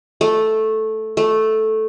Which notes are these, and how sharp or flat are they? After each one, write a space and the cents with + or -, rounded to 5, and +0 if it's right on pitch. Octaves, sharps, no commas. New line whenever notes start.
A3 -5
A3 -5